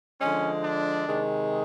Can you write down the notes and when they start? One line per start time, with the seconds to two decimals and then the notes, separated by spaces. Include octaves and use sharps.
0.20 D3 F3 G#3 C#4
0.64 D4
1.07 C3 D#3 G#3